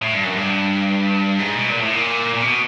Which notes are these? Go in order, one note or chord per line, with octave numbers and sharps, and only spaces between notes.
A2
G2
F#2
G2
G#2
B2
A#2
A2
A#2
A#2
B2